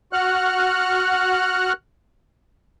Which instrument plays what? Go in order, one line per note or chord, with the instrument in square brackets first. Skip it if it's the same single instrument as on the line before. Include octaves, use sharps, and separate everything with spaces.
[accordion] F#4 F#5 F6 F#6